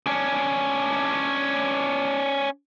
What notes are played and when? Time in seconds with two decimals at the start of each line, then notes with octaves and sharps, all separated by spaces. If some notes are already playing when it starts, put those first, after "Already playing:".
0.07 C#4 D4